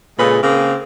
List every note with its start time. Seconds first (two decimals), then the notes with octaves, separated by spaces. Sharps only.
0.19 A#2 C#3 G#3 A4 B4
0.42 C#3 A#3 C4 G#4